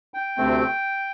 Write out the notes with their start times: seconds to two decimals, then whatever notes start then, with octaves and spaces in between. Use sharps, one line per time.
0.14 G5
0.38 D2 C3 A3 C4